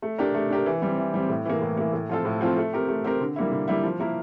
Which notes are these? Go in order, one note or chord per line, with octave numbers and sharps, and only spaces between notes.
A3
D4 G4 A#4
A3
D4 G4 A#4
E3
G3 C4
E3
G3 C4
A2
E3 A#3
A2
E3 A#3
A2
F3 C4 F4 A4
A2
F3 C4 F4 A4
A3
C4 G4 A#4
A3
C4 G4 A#4
D3
G3 A#3 E4
D3
G3 A#3 E4
F3
A#3 E4 A#4